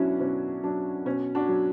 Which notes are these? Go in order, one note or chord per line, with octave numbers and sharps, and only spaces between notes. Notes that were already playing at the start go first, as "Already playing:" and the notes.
Already playing: B2 F#3 C#4 D4 E4 F#4
B2 C#4
F#3 D4
B2 C#4
D4 F#4
F#3